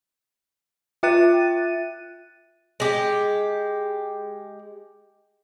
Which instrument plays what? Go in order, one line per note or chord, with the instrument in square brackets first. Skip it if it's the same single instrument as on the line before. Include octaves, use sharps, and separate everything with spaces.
[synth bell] F4 E5 G5 F#6 A6 D#7
[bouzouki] G#3 G4